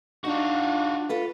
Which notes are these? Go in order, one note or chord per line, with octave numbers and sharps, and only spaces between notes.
D4 D#4 F4 F#4
F4 A4 B4